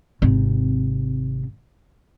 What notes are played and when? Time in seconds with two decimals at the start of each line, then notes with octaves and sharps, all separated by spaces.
0.22 G#1 C3